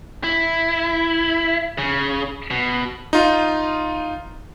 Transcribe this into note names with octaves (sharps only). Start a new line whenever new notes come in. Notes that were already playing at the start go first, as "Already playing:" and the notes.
E4
C#3
B2
D#4 F4